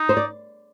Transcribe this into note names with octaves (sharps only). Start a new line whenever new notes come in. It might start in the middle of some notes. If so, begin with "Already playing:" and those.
Already playing: D#4
C5
D5